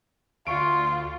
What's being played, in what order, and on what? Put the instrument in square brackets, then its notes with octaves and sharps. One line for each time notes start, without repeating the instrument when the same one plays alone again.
[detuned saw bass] D2 [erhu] F4 [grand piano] C6 C#6 D7